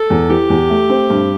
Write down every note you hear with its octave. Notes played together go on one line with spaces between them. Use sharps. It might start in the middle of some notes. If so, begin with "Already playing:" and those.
Already playing: A4
E2
E3 G4
E2
A3
C4
G2